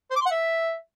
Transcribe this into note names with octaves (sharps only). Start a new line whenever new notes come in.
C5
D6
C6
F#5
E5